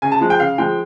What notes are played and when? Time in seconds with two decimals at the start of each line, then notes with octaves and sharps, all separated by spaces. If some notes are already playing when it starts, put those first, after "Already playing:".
0.02 C#3 G#5
0.12 A5
0.21 F3 G#3
0.30 G5
0.40 C#3 F5
0.58 F3 G#3 G5